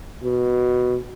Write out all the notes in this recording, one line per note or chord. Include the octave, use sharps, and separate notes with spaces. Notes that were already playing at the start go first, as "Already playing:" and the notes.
B2